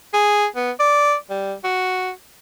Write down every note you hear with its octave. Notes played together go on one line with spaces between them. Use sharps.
G#4
B3
D5
G3
F#4